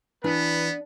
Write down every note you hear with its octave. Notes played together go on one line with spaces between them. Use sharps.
E3 B3 D4 B4